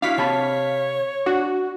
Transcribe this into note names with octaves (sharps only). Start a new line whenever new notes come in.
D4 E4 F#4 F5 B6
C3 C#5 A5 B5
D4 F#4